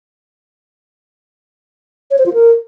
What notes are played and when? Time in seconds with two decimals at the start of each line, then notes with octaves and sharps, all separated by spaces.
2.11 C#5
2.18 C5
2.26 F4
2.34 A#4